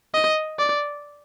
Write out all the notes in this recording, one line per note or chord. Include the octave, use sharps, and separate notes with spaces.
D#5
D5